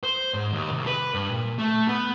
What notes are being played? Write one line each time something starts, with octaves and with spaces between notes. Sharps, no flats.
C5
G#2
D#2
C2
B4
G2
A#2
A3
B3